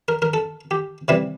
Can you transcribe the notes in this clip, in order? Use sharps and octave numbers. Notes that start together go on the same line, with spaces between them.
A#4
A#4
A4
G4
C3 E3 G3 E4